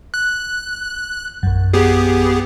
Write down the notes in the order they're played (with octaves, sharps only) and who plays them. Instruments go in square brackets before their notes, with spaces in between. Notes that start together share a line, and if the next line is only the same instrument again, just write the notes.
[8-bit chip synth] F#6
[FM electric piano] A#1 F#2
[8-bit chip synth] B3 G4 G#4